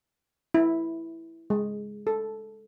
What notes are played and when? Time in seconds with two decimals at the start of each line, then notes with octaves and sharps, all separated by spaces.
0.54 E4
1.50 G#3
2.07 A4